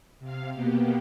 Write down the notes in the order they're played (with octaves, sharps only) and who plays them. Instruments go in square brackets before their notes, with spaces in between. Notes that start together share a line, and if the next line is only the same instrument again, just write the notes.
[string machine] C3 F5
B2 A#3 B3 G4